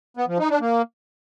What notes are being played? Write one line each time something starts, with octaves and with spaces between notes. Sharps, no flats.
B3
F3
D#4
D4
A#3